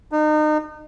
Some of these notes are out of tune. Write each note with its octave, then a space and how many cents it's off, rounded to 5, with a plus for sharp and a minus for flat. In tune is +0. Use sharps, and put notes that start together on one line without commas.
D#4 -35